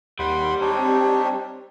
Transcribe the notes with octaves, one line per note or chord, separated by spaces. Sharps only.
D#2 G3 F#5 B5 C6
C4 D4 D#4 G4 C#5